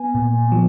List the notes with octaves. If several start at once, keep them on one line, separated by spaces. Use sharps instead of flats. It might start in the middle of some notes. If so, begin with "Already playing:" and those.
Already playing: B3 G#5
A#2
F3